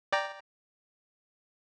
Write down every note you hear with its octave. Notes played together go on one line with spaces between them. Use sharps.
D5 G5 A#5